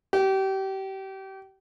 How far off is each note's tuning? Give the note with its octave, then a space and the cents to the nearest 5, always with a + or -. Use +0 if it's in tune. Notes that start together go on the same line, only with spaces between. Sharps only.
G4 -30